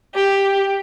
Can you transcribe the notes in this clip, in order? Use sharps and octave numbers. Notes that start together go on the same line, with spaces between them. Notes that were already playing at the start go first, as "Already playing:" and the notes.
G4